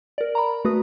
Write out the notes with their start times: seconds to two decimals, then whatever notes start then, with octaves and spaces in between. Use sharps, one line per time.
0.18 A#4 D5
0.35 A#5 B5
0.65 A3 F#4 B4 D#6